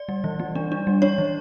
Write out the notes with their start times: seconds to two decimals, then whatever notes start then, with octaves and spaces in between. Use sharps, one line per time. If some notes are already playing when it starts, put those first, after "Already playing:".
Already playing: D5
0.09 G3
0.24 E3
0.39 G3
0.55 D4
0.72 D4
0.87 G3
1.02 D4 C#5
1.18 E3